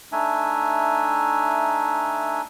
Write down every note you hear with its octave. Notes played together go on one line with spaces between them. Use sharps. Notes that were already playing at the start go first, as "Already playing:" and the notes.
A3 D4 D#4 E5 G#5